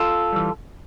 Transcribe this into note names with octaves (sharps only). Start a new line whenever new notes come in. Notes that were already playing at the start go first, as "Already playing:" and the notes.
Already playing: F4 A4
E3 G3